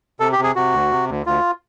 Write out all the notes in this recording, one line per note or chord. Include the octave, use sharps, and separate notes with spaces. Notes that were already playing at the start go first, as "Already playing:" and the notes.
C3 A4
G4
C3 G#4
C3 F#4
D2
C3
D2
D2 F4